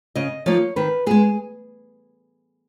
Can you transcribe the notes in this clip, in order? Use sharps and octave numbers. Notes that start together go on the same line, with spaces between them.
C#3 D#5
F3 A#3 D#4 C#5
D#3 B4
G#3 B3 G#4